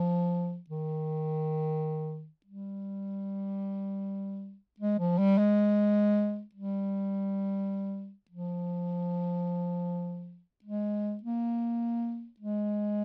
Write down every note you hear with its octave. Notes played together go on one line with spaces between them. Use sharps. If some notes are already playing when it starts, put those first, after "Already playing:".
Already playing: F3
D#3
G3
G#3
F3
G3
G#3
G3
F3
G#3
A#3
G#3